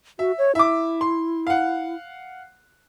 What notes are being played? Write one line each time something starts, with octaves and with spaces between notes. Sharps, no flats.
F#4 E5
C#5
E4 E5 D6
C6
F5 F#5